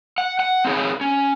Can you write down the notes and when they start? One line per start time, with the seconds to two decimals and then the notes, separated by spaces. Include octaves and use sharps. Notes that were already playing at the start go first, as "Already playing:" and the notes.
0.18 F#5
0.40 F#5
0.65 C4 D#4 G#4 C#5
1.01 C#4